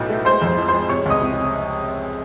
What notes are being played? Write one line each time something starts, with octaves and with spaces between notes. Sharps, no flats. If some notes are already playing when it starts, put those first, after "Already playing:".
Already playing: B1 A2 F#3 B4
A3
G#3 C5 C6
F2 C5 C6
F3
G#3 C5 C6
C3 C#5 C#6
C#2 D#5 D#6
C3